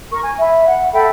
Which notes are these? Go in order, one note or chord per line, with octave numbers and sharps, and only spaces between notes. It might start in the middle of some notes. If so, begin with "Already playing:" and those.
A#4 C#6
G#5
E5 B5
F#5
A4 E5 G5 B5